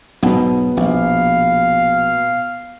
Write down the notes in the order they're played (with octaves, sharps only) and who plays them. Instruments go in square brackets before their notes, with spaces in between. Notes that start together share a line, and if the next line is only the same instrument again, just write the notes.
[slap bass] B1 G#2 [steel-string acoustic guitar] B2
[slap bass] A#1 [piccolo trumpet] F5